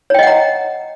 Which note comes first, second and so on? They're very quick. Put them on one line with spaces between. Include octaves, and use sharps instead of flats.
C#5 G5 D#5 F#5 A#5